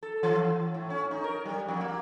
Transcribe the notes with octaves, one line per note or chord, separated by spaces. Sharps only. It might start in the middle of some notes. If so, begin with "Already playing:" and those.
A4
E3
E3
A2
C#4
D#4
A#4
G3
F2
A#3